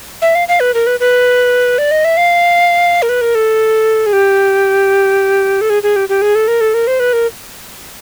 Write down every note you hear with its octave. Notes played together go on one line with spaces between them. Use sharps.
E5
F5
F5
B4
A#4
B4
B4
D5
D#5
E5
F5
A#4
B4
A#4
A4
G#4
G4
A4
G#4
G#4
G4
G4
G#4
A4
A#4
A4
A#4
C5
B4
A#4